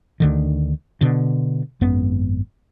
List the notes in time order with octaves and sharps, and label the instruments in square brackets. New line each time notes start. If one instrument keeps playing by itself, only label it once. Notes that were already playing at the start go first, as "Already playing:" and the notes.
[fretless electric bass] D2 D3 D#3
B2 D3
G#1 F#2 B3